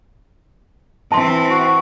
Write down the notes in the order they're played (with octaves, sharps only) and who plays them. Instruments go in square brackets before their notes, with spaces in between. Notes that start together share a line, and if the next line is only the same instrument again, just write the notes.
[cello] E3 C4 [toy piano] A5 C6
[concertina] F#4